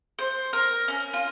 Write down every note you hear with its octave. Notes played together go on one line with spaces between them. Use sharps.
C5
A#4
C#4
F4